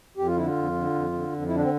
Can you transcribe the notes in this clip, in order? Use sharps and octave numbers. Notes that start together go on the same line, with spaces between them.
F2 G4
F4
D3 E4
F4
F2
D3
F2
D3
F2
E4
D3 D4
C4